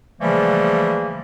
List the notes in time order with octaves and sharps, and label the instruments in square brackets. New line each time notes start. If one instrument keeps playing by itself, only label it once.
[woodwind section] C#3 E3 F3 G3 A3 A#3